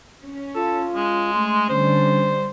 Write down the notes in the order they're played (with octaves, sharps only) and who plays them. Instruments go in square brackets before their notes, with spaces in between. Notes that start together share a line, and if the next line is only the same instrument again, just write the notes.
[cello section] C#4
[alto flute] F4 [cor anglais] A4
[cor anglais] G#3
[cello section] A3 [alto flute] C6
[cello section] D3 G3 [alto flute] C#4 [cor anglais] C5